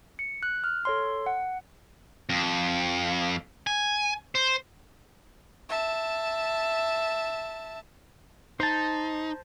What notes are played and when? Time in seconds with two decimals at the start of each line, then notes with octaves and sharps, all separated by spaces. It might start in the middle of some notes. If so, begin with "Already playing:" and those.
0.19 C#7
0.43 F#6
0.64 F6
0.85 A4 C#5 C6
1.26 F#5
2.29 F2
3.67 G#5
4.35 C5
5.69 E5 A5
8.60 D#4 C5 A5